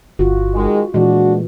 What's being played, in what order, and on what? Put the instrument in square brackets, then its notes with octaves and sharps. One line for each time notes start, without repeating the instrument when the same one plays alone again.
[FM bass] G1 [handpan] F4 F#4
[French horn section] D#3 G#3
[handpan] A#2 E3 [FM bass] G#3 [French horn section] D4 F#4